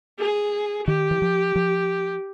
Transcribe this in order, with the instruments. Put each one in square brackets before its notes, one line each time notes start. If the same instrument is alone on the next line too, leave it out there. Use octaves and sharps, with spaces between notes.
[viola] G#4
[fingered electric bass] D#3 [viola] G4
[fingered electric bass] E3
F3
F3